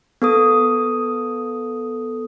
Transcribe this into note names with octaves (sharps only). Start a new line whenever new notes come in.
B3 A4 D#6